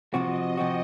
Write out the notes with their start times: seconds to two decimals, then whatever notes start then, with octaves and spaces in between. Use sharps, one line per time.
0.13 C3 F3 C4 F#4 D#5
0.57 C3 F3 C4 F#4